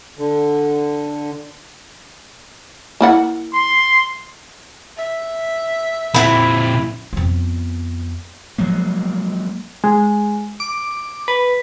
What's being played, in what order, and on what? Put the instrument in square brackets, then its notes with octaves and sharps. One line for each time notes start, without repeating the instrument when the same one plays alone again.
[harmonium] D3
[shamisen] A#3 E4 F#5
[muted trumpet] C6
[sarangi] E5
[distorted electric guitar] A#2 C4 [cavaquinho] E4 B5
[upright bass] F2 B3
[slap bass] F3 F#3 G#3 A#3
[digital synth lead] G#3
D6
B4